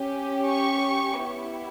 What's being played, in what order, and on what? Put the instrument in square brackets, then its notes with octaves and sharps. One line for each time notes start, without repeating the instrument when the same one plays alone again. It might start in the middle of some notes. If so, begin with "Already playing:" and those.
Already playing: [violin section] C#4 G4
C#6
B3 E4 G4